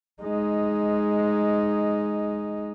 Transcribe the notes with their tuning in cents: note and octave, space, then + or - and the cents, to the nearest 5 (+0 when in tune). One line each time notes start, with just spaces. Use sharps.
G#3 +5 D#4 +0